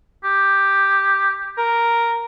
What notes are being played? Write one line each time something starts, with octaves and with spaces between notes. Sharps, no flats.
G4
A#4